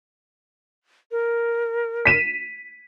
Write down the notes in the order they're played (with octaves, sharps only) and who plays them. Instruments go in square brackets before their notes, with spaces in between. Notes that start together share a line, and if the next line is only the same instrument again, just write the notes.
[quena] A#4
[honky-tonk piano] B6 D#7 E7